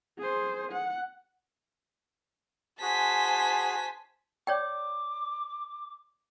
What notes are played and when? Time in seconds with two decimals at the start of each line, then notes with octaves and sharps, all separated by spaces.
0.18 G#4 C5
0.72 F#5
2.82 F#4 G#4 C5 G#5 A5 B6
4.47 C#5 D5 G5 D6